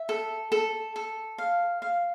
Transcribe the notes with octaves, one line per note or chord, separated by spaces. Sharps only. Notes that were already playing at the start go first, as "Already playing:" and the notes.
Already playing: E5
A4
A4
A4
F5
F5